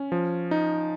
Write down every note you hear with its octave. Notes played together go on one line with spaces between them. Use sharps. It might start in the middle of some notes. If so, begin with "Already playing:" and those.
Already playing: C#4
F3
D#4